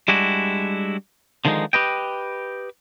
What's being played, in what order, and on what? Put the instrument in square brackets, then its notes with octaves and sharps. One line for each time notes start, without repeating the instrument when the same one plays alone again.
[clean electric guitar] G3 G#3 D4 E4 F#4
D3 D#3 F3 G#3 D#4
G4 B4 D#5 G5